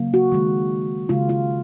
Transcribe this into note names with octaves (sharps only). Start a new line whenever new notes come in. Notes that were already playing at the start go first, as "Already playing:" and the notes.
Already playing: C#3 F#3 A#3
F#4
D#3 G#3
C#3 G#3 F4
F4